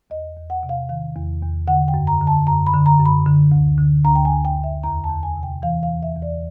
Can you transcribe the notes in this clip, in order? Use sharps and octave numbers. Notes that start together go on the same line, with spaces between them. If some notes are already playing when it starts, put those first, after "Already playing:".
E2 D#5
E2
F#5
C3
F5
D#3 F5
E2
E2
D3 F#5
G5
F#2
A#5
D3
A5
F#2 A#5
B5
D3
A#5
F#2
B5
D3
D2
D3
D2 A#5
G5
G#5
D3
G5
D2
E5
E2 A#5
A5
E2
G#5
C3
G5
E3 F5
F5
E2
E5
E2
D5